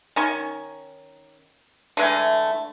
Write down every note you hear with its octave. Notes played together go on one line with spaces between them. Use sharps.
D#3 C#4 C#6
D3 E3 G#3 A3